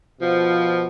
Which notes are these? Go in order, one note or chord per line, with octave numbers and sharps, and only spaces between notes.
B2 F3